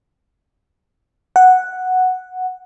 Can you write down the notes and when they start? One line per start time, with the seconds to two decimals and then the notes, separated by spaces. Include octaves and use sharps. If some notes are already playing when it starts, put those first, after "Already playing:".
1.36 F#5